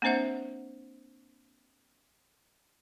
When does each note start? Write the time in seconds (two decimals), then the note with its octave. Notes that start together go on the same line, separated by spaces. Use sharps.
0.02 A#3 C4 D4 C5 E5 F#5